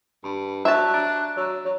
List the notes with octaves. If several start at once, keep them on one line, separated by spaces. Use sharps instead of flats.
G2 B5
F#3 D4 D5 E5 A5 E6 F#6
D4 A#5
F#3 C#5 A#5 E6
F#3 C#5